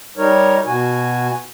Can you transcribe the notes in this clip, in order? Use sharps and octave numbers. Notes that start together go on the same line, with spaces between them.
G3 D#4 A#4 C#5
B2 F#4 G#5